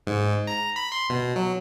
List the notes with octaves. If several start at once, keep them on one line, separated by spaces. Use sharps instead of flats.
G#2
A#5
B5
C6
B2
F#3